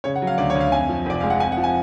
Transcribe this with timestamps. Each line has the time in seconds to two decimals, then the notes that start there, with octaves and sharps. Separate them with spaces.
0.04 C#3 C#5
0.16 F#5
0.22 F#3
0.27 F5
0.38 D2 D5
0.50 C#5
0.55 D2
0.60 F5
0.72 F2 G#5
0.89 F3
1.06 F1 D5
1.20 G#3 F5
1.30 F#5
1.40 F2 G#5
1.52 F#5
1.57 F3
1.64 G#5